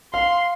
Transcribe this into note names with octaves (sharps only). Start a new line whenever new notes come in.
F5 C6